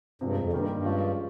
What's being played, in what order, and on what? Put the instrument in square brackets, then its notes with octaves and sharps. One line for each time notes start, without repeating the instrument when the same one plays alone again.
[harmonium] G2 [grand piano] C3 F3 G#3
[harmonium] F2
[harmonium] G2 [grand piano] D#3 G3 A#3
[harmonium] G2
[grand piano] F3 G#3 C#4 F4 G#4